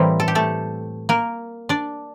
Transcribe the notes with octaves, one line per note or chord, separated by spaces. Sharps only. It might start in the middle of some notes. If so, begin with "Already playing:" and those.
Already playing: A2 E3 G3 A#3 C4
A4
G4
A3 A4
A#3 A#4
D4 D5